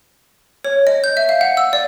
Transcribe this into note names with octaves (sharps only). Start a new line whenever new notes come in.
C#5
D#5
G6
E5
F5
F#5
E6
D5